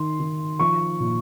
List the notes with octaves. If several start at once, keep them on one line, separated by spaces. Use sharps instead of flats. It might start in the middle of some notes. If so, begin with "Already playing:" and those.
Already playing: D#3 C6
D#3
F3 C#6
A#2